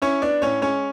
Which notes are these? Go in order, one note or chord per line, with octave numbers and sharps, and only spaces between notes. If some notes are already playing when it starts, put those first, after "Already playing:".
C#4 E4 C#5
B3 D4 D5
A2 C#4 C#5
G#3 C#4 C#5